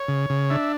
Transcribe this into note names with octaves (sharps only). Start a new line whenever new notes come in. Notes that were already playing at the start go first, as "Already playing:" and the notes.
Already playing: C#5
C#3
C#3
D4 E5